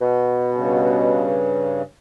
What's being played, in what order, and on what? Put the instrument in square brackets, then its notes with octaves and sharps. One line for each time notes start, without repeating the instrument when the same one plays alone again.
[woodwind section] B2
[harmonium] G2 C#3